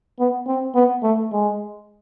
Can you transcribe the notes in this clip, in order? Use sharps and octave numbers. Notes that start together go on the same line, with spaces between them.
B3
C4
B3
A3
G#3